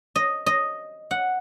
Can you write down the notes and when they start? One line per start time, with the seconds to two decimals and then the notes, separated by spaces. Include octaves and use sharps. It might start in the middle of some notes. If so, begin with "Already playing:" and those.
0.16 D#5
0.46 D#5
1.11 F#5